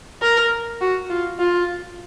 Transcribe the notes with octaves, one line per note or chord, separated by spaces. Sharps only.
A#4
F#4
F4
F4